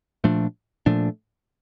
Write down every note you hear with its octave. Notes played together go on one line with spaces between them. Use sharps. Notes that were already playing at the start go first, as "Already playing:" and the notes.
A#2 F3 A3 D4
A#2 F3 A3 D4